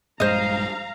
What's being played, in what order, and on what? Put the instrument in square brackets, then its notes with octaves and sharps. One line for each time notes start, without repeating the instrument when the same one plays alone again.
[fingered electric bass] A#1 G2 G#3 [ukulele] C5 D#5 [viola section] F5 A#5